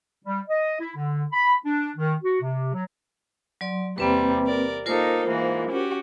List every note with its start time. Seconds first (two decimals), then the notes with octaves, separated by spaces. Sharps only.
0.24 G3
0.48 D#5
0.79 E4
0.96 D3
1.32 B5
1.64 D4
1.97 D#3
2.23 F#4
2.41 C3
2.73 F#3
3.61 F#3 D5 C6
3.98 E2 C3 G3 A#3 C4 B4
4.46 A#4 D5
4.86 A#3 D#4 F4 A4 A#4 C5
5.27 G#2 E3 A#3
5.70 C#4 F#4 G4